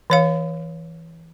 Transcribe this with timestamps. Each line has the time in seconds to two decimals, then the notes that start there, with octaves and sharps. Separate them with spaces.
0.10 E3 C#5 F5